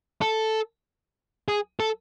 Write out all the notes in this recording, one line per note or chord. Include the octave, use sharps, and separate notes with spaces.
A4
G#4
A4